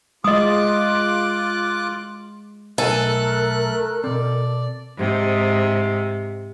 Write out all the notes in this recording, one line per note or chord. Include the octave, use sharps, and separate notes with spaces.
G#3 F4 D#5 D6 D#6 F#6
B1 A3 A4 A#4 G#5 F#6
B2 C4 D5
G#2 C3